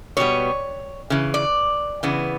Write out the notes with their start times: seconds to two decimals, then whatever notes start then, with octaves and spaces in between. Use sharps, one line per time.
0.17 B2 G3 B3 C#5
1.10 C#3 E3
1.34 D5
2.03 C#3 E3 B3